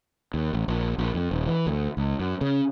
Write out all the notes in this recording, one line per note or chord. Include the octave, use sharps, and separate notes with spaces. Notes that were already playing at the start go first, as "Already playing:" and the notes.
D#2
A1
A#1
A#1
F2
D#1
E3
D2
C#2
F#2
C#3